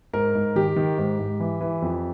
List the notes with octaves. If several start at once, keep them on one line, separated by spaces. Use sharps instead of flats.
G#2 A#4
G#2
D#3 G4
D#3
G#2
G#2
E3
E3
F2